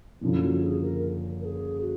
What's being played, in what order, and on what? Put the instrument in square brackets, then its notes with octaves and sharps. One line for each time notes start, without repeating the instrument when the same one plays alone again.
[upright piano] F#1 F#2 D3 F3 [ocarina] E4
[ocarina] F#4
G#4
A#4
A#4
G#4
F#4